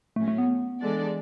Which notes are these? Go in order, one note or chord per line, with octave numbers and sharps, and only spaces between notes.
A2 F#3 A3 C#4
A3
B3
E3 G#3 D4 A4 D5